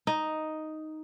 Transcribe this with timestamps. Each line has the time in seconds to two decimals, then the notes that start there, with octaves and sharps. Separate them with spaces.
0.07 D#4